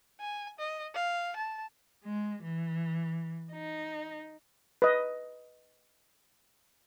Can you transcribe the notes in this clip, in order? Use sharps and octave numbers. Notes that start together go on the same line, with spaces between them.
G#5
D#5
F5
A5
G#3
E3
D#4
B4 D#5